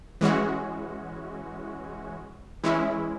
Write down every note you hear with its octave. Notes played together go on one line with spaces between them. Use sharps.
E3 G#3 C#4 F#4
E3 G#3 C#4 E4